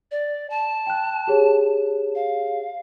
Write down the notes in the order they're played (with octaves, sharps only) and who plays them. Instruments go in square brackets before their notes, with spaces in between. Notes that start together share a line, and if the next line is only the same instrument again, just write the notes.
[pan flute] D5
A5
[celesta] G5 F#6
G4 G#4 C#5
[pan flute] F5